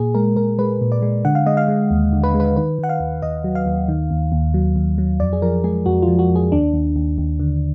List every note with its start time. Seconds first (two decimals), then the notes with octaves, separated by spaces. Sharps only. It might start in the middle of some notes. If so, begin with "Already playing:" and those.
Already playing: A#2 G#4
0.14 G#3 A#4
0.36 A#2 A#4
0.58 G#3 B4
0.81 A#2
0.92 D5
1.02 G#3
1.25 D3 F#5
1.35 F5
1.46 G#3 D#5
1.57 F5
1.68 G#3
1.91 D#2
2.13 D3
2.23 B4
2.34 G#3
2.40 B4
2.57 D#3 B4
2.78 D#3
2.83 F#5
2.89 F5
3.00 D#2
3.22 D#2 D#5
3.44 F#3
3.55 F5
3.66 D#2
3.88 D#3
4.10 D#2
4.32 D#2
4.54 F#3
4.76 D#2
4.98 F#3
5.20 F2 D5
5.33 G#4
5.42 F3 A#4
5.64 G#3 G#4
5.86 F2 F#4
6.02 F4
6.08 F3
6.19 F#4
6.30 F2
6.36 G#4
6.52 D#2 D4
6.74 D#2
6.96 D#2
7.18 D#2
7.39 D3